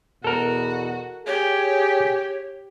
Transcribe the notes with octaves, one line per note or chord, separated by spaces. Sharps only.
E2 B2 F#4 A4 A#4
G4 G#4 C#5